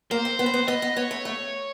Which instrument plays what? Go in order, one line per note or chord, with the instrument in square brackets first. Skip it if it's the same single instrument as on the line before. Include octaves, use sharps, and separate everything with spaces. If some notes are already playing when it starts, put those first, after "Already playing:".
[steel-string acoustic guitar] A#3 [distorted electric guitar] C5
[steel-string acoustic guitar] C4
B3
C4
B3
[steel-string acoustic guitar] B3 [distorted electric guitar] D#5
[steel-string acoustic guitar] B3
[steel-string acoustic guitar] B3 [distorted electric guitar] C#5
[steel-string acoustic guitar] A3
A3